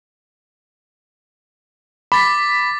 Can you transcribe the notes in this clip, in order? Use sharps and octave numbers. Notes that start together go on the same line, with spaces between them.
B5 D6 A6 B6